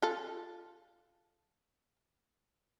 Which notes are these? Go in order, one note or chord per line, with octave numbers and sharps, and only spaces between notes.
F4 A4